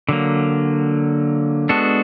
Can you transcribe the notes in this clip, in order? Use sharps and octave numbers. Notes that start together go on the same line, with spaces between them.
D3 F#3 A#3
G#3 B3 D4 F#4 A4